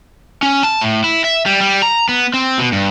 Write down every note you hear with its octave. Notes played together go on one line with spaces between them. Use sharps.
C#4
A5
A2
E4
E5
G3
G3
A#5
B3
C4
B2
G2